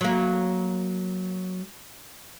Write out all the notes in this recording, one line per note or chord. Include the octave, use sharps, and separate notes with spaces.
F#3 A#3